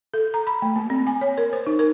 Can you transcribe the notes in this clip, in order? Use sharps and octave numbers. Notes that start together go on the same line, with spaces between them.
A4
A#5
B5
A3
A#3
C4
G#5
C#5
A#4
C5
D#4
A#4